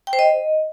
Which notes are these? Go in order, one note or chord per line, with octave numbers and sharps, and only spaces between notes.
G5
C5
D#5